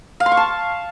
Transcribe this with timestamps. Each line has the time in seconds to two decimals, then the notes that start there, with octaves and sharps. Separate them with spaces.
0.20 F5
0.26 C6
0.32 C#6
0.37 A5